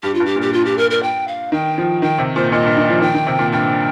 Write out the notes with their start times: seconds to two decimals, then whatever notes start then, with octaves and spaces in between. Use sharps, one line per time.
0.03 G2 G4
0.14 F4
0.20 G2
0.26 G4
0.36 A#2
0.42 G4
0.53 F4
0.65 G4
0.78 A#4
0.91 A#4
1.03 G5
1.28 F5
1.52 D#3 G5
1.78 F3
2.02 D#3 G5
2.18 C3
2.36 A#2 C5
2.52 A#2 D#5
2.65 G2
2.77 D#3
2.90 F3
3.01 D#3 G5
3.14 D#3
3.27 C3
3.39 A#2
3.52 G2 G5